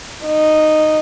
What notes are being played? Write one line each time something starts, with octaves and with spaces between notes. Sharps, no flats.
D#4